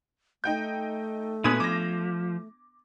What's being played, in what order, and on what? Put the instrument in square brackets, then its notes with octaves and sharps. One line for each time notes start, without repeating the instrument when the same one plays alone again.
[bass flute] A3 [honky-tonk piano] D#4 G5 G6
[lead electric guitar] A#2 B4 [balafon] B3 D4 [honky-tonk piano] D#6 G#6 D#7
[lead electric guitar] F3 [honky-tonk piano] D6 A#6